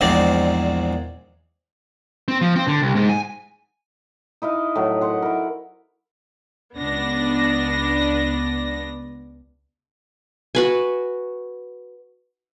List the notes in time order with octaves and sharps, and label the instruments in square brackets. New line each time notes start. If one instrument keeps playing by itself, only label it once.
[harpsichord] A#1 E2 A#2 G#3 C4 D5
[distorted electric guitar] C4
F3
C4
D3
C2
G#2
G#5
[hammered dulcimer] D#4 E4 D#5 F5
A2 F#3
A#4 C5 F#5
E4 A#4
[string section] C#2 B3 D4 D5 A#6
[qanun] F#4 B4 G#5